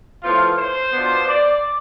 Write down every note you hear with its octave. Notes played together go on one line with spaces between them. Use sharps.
A2 F3 B3 F4
C5
B2 B3 D4 F4
D5